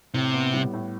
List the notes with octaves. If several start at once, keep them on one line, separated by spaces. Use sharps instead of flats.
A2 C3
B3
G3
A2